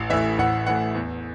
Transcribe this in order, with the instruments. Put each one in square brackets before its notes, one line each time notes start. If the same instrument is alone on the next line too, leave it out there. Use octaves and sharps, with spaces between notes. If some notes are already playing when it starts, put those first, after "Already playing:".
Already playing: [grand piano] A1
A2 E3 E5
A1 F#5
A2 E3 F#5
E2